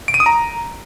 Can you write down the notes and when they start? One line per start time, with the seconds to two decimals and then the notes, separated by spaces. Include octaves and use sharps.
0.08 D7
0.14 D#7
0.20 D#6
0.26 A#5